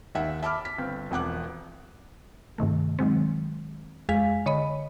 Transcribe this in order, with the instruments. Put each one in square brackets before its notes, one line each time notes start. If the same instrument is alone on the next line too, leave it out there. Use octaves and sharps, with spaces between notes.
[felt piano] D#2 E5 F#5
E5 A5 B5 D6 F6
B6
G1 C4
E1 F2 F#5 D6 F#6
[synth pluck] G2 C3 D#3 A3
D#3 F#3 G#3 C4
F2 G#3 G#4 F5 G#5 B6
D3 C#5 D#5 B5